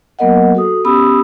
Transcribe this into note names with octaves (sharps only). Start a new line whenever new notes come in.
F#3 A#3 B3 A#4 D#5 F#5
F#4 A4 D#6
B3 C#4 G4 B5 D#6 E6